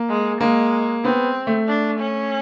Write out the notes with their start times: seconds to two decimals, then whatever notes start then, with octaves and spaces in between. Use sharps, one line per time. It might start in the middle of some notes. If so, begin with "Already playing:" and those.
Already playing: A#3
0.09 G#3
0.41 G#3 A#3
1.04 B3 C4
1.47 A3
1.68 D4
2.00 C#4